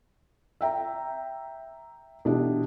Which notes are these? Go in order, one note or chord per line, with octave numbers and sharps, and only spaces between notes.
E5 G5 A#5
B2 E3 D4 G4